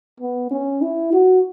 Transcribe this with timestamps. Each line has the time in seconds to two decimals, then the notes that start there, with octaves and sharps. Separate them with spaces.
0.20 B3
0.51 C#4
0.82 E4
1.13 F#4